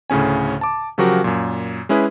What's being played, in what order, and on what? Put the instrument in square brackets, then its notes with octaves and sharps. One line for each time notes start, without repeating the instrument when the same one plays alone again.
[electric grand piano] D2 A2 C#3 C#4 G#5
A5 D6
C#3 F3 F#3 F#4 G4 A#4
F#2 A#2
G#3 C#4 E4 G#4 B4